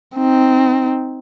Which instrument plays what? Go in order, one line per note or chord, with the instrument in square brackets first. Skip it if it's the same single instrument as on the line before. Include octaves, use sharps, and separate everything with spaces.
[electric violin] C4 D#4